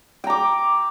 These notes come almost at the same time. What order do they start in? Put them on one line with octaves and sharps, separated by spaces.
G5 A#5 D6